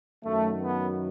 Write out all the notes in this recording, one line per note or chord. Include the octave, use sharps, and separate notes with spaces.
F#2 D#3 F#3 A3
B3